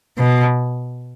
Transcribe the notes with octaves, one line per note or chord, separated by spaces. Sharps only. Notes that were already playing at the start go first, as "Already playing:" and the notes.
B2